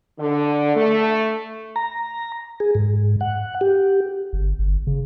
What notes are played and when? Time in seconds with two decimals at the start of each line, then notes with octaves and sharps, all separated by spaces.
0.19 D3
0.75 A3
1.76 A#5
2.60 G#4
2.75 G#2
3.21 F#5
3.61 G4
4.33 G1
4.59 G1
4.87 C#3